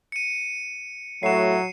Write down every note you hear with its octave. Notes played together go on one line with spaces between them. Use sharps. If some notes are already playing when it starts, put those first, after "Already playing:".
C#7 D#7
A2 F#3 A3 F#4 C7 E7